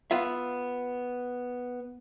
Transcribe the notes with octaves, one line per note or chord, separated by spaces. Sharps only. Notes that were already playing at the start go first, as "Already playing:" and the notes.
B3 F4 E5